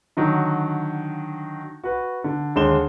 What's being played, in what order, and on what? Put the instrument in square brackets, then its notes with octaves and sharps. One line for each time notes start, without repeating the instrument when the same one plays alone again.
[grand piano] D3 D#3 F#3
F#4 B4
D3
D#2 D3 G#3 C6 E7 G7